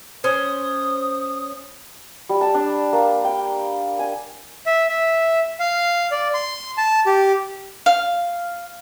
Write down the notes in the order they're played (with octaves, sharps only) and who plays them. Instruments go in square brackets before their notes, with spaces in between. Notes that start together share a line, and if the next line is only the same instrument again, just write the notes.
[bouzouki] C#4 C5 [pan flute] D#6
[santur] G3
A5
D4
A#3
G5
G#5
[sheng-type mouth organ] E5
E5
F5
D5
C6
A5
G4
[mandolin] F5